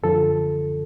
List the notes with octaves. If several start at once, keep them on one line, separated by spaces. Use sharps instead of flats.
F#2 D3 F3 A4